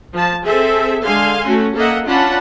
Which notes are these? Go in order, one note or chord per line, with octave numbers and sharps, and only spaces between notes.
F3 A5
C4 G#4 A4 E5
D3 G#3 F5 G#5 C6
A3 C#4 F#4
A#3 A4 D#5 E5 F#5
C#4 D4 F4 F#5 A5 B5